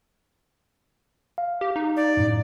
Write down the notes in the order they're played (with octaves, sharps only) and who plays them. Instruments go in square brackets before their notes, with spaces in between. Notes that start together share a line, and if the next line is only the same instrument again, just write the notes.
[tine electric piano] F5
[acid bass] G4
D#4
[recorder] D5
[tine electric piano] F#2 A2